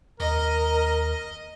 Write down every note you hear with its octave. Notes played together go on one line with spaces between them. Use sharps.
D#2 A#4 D#5